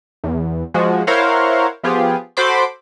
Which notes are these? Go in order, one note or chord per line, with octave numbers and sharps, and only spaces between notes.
E2
F3 G#3 F#4
E4 A#4 C5 C#5 F5 F#5
F3 B3 F4 G4 G#4
F#4 A4 C5 B5 C6 D6